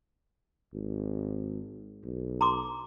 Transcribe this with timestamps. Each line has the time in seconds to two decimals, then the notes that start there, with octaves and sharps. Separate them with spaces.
0.74 G#1
2.04 B1
2.41 A#5 C6 D6